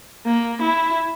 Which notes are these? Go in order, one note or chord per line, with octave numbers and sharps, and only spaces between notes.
A#3
E4